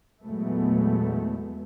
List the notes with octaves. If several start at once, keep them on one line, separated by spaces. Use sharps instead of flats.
E2 A#2 F#3 G#3 A3 B3